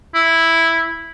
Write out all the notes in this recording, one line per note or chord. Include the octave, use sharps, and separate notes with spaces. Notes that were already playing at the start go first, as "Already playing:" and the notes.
E4